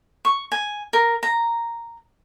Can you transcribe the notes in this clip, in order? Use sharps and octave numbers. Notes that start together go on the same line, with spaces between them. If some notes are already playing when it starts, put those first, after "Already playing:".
C#6
G#5
A#4
A#5